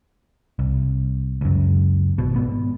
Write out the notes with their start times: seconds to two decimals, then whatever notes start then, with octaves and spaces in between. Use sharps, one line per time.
0.59 C2
1.41 C#2 F#2
2.18 G#1 B2
2.36 G#2 B3